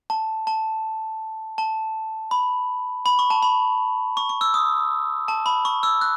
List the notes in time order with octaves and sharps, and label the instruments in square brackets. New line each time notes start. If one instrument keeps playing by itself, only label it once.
[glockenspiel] A5
A5
A5
B5
B5
C#6
A5
B5
C#6
C#6
E6
D#6
A5
B5
C#6
E6
F#6